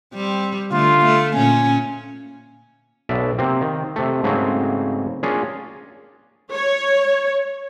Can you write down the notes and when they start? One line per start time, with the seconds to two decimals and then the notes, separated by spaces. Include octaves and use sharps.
0.14 G3 C4
0.72 D3 A3 F4
1.05 A3
1.34 A#2 C#4 G#5
3.09 B1 B2 D5 E5
3.38 C3 A#3 C4
3.61 D#3
3.96 C3 A3
4.23 G#2 C#3 F#3 A3 A#3 C4
5.23 A#3 C#4 D4 F4 G#4
6.54 C#5